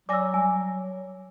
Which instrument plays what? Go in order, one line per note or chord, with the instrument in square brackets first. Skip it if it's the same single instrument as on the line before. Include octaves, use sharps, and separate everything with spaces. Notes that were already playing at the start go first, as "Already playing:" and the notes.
[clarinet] F#3 [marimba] D5 G#5 A#6 [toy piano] D6 E6
[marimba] G3 [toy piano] G#5